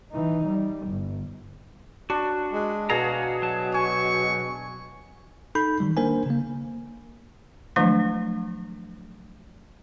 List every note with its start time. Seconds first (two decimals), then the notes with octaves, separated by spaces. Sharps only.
0.12 E3 D#4
0.45 G3
0.87 G1
2.10 D4 F#4
2.53 G#3
2.90 B2 F#4 G#4 F5 A#5
3.42 F#3 A5
3.74 G#5 C#6
5.55 D#4 A4 B5 G6
5.80 D#3 E3 G3
5.97 A#3 D4 A#4 C5 G#5
6.26 C#3 A#3
7.76 D#3 F3 F#3 G#3 A3 D4